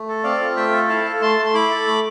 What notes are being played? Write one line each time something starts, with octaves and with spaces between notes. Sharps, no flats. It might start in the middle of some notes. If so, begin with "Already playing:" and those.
Already playing: A3
A4
C4 D5 F5
F4
A3 E5 G5
A4
E4 F5 A5
A4
A3 A5 C6
A3
C6
E4 B5 D6
A4
A3